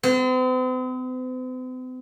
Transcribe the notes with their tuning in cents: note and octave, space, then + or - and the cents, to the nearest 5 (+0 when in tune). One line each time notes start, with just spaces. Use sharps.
C4 -45